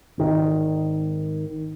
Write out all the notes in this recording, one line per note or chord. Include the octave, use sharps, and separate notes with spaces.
G#1 D#3